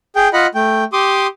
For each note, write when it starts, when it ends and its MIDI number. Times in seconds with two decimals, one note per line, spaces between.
0.16 0.28 68
0.16 0.28 79
0.33 0.47 65
0.33 0.47 75
0.33 0.47 78
0.33 0.47 83
0.55 0.84 57
0.55 0.84 79
0.93 1.27 67
0.93 1.27 84
0.93 1.27 86
0.93 1.27 87